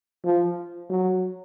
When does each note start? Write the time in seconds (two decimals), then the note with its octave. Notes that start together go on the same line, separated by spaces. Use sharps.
0.24 F3
0.90 F#3